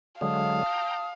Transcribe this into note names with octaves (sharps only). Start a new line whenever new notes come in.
D3 F#3 G#3 F5 A5 D#6
G5 A#5